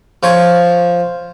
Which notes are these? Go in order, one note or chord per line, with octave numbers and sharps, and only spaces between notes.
F3 C#5